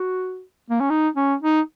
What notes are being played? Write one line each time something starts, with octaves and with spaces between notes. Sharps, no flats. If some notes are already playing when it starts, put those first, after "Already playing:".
Already playing: F#4
A#3
C#4
D#4
C#4
D#4